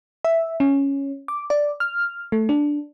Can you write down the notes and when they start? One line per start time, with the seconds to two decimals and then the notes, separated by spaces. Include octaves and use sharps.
0.25 E5
0.60 C#4
1.28 D6
1.50 D5
1.80 F6
2.32 A3
2.49 D4